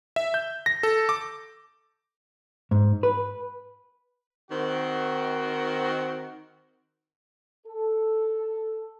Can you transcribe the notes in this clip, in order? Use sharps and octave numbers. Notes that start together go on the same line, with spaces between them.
E5
G6
A#6
A4
D6
G#2
B4
D#3 C4 F#4
A4